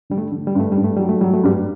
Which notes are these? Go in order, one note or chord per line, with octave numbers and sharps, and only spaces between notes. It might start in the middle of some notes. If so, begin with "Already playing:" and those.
D3 G3
A3
D3
G3
G2 A3
G2 G3
A3
F#3 G3
A3
F#3 G3
A3
G2 G3